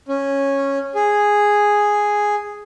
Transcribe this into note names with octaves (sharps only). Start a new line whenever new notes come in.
C#4
G#4